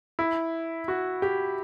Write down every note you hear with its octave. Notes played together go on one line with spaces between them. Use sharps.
E4
F#4
G4